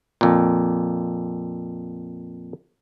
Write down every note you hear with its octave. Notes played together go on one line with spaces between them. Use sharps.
F2 A#2